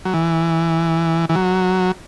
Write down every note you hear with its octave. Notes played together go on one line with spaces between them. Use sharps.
F#3
E3
E3
F#3